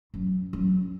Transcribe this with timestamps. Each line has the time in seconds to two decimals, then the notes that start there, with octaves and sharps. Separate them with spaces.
0.14 F#2
0.53 F#2